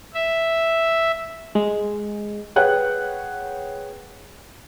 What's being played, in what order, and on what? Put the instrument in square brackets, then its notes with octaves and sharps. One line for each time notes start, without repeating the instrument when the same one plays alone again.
[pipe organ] E5
[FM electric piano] G#3
[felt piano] G#4 B4 C#5 F#5 G5 F#6